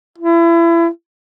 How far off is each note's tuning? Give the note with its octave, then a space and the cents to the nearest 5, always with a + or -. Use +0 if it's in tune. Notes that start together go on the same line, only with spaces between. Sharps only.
E4 +30